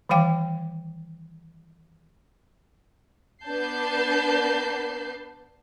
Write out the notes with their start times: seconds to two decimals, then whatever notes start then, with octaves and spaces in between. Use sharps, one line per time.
0.09 D#3 E3 G3 F5 G5 D6
3.46 B3 D4 B4 A5 G6 C7